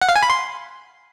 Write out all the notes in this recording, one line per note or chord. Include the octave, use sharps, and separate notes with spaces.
F#5
F5
G#5
B5
C6